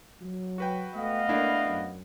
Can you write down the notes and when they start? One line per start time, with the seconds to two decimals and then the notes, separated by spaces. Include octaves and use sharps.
0.21 F#3
0.58 F#4 B4 G5
0.95 A3 B3 D#5 F5
1.29 A3 A#3 D4 E4
1.66 F#2